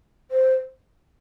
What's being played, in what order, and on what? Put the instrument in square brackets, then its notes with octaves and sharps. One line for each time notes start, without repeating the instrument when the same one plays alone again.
[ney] C5